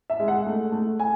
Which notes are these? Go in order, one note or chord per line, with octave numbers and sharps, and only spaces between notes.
E5
G#3
F#5
A3
A3
G#5